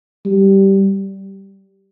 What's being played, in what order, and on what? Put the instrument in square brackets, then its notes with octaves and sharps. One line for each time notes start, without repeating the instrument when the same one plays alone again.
[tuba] G3